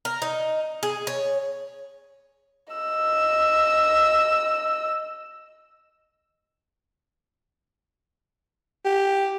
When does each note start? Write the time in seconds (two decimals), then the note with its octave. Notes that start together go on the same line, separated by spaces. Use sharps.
0.05 A#4
0.22 D#4
0.83 G#4
1.07 C#5
2.73 D#5 E6
8.85 G4